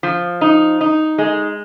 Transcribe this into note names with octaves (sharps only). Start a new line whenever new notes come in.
F3
D#4
D#4
G#3